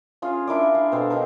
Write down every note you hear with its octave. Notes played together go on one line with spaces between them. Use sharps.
C#4 F4 G#4
D4 E4 A#4 D5
F5
B2 C4 A4
D4 D#4 G4 A#4